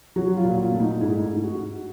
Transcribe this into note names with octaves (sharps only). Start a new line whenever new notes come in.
F#3 F#4
F4
A#2
F4
A3
D#4
G#2 E4
G#2
F#4
G#2